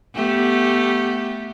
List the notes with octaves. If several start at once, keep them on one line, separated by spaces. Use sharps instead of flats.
A3 B3 G4